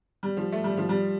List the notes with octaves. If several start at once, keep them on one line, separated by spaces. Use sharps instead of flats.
G3
F3
A3
G3
F3
G3